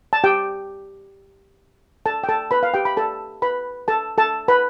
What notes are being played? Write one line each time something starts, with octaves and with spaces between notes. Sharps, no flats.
A5
G4 G5
A4 A5
G5
A4 A5
B4 B5
F5
G4 G5
B5
A4 A5
B4 B5
A4 A5
A4 A5
B4 B5